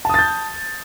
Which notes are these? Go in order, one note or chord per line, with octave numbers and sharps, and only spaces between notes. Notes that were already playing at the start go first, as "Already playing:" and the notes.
A5 D#6 G6 A6